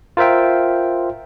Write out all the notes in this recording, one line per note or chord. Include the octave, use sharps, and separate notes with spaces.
F4 A#4 C5 E5 G5